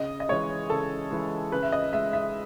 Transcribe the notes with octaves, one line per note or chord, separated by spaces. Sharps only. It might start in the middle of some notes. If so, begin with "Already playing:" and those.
Already playing: C#3 D#5
D#5
E3 G#3 C#5
C#3 A4
E3 G#3
C#3 B4
E5
D#5
G#3 E5
E5